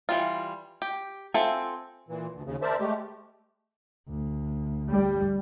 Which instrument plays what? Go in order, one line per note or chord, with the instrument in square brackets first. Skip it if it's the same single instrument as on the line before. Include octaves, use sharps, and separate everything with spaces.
[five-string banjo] E3 G3 F4
G4
C4 F4 A4 E5 G#5
[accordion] A#2 E3
D2
D#2 C#3
A#4 C5 D5 E5 A5
G#3 A3 G4
[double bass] D2
[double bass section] G3